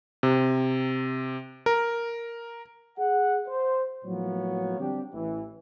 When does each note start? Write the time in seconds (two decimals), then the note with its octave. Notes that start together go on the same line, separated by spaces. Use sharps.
0.23 C3
1.66 A#4
2.99 G#4 F#5
3.47 C5
4.05 A2 F3 F#3 A#3 B3 C#5
4.79 D3 G3 C4 D4 G4
5.14 A1 E3